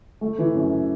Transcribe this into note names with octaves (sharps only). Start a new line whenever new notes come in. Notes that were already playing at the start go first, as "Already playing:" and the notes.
A3
E3
F#2